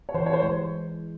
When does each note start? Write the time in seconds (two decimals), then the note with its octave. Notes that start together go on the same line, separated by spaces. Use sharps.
0.09 C#5
0.14 E3 C5
0.26 C#5
0.33 C5
0.43 G#3